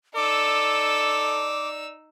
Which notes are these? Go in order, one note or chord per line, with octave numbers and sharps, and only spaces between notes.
D#4 A4 D5 D6 E6